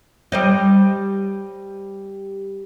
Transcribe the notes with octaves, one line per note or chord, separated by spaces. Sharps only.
G3 C5 D#5